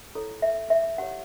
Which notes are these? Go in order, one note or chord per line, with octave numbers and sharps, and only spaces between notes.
E4 A4 C#5
E5
E5
E4 G4 C#5 F#5